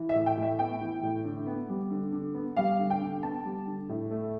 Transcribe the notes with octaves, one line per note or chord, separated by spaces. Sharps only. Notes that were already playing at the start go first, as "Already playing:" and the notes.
Already playing: E3
E5
A2
G5
A2
E5
B3 G5
E3
A2
D3
B3
G3
D3
D3
B3
G3 F5
D3
G5
D3
B3 A5
G3
D3
A2
A3